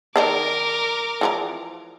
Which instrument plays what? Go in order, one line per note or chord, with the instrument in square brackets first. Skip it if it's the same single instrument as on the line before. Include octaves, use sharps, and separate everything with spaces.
[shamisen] D#3 D4 D#4 [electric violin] A#4 D6
[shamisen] E3 F3 A#5